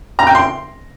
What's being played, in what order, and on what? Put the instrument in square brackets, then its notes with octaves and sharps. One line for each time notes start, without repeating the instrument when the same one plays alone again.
[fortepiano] A#5
G5
C6